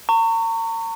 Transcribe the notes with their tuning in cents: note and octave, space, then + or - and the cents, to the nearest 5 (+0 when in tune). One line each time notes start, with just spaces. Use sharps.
A#5 -40 C#6 +0